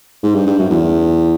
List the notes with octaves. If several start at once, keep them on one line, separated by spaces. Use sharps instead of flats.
G#2
G2
G2
F#2
E2